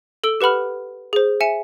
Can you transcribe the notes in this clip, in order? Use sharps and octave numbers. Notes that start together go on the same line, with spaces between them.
A4 E6 D7 G7
G4 B4 F#5 B5 F6
G#4 C5
E5 G#5 C#7 E7